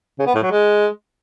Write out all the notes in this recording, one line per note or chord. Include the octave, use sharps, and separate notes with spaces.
C#3
B3
A2
F#3
G#3